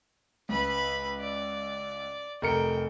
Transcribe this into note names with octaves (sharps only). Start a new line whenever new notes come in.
C#2 B4 B5
D5
F1 A#4 G5 C#7